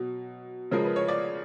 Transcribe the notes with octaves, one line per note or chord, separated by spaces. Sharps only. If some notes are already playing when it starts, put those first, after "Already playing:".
Already playing: B2 F#3
C#3 F3 G#3 A#4
B4
C#5
D5